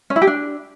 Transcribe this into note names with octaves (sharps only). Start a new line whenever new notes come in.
C#4
E4
G4
D4